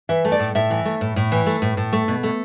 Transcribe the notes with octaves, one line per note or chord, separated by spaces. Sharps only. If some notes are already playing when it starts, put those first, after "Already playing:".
E3 E5
A3
D5
A2
A2 E5
E3
A3
A2
A2
E3
A3
A2
A2
A3
B2
A3